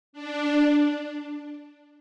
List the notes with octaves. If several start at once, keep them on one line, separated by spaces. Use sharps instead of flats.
D4